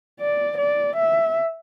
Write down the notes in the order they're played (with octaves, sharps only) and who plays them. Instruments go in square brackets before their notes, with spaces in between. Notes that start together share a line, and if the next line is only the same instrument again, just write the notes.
[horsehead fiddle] D5
D5
E5